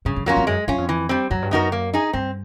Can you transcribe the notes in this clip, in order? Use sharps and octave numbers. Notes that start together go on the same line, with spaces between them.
G2 C#3
F#2
F2 F#3 A#3 C#4 F4
F2
F#2 G#3
F#2 C#4 F4
F2
E3
G3 C4
F#2 F#3
G2
F#2 B3 D#4 F#4 A#4
A#3
D#4 G#4
G2 C4